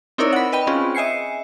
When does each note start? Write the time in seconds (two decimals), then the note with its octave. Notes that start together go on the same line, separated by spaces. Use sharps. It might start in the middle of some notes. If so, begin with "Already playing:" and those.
0.18 C4 D#4 E4 A#4 C#5 D5
0.33 F#5 B5
0.52 B4 D#5 G5 B5
0.67 C4 C#4 F4 G#4
0.95 D#5 E5 G#5 C7 C#7